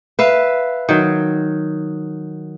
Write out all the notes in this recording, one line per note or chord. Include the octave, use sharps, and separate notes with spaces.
B4 E5 F5
D#3 F#3